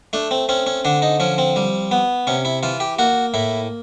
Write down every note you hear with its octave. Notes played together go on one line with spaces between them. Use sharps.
A3 D4
C4
C4 C#4
C#4
D3 D4
D#4
F3 C#4
C4
G3
B3
C3 C#4
E4
E3 F4
G4
A#3 F#4
A2 E4